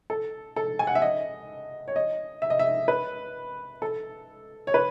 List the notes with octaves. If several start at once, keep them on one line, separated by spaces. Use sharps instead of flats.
A4
A4
G#5
F#5
E5
D#5
C#5
D#5
E5
D#5
E5
B4
A4
C#5
B4